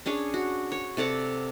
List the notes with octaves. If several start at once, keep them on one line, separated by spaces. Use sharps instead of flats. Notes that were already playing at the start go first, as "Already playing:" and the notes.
C#4 D4 G#4 C#5
F#4
C#5
C3 A4 D5 F#5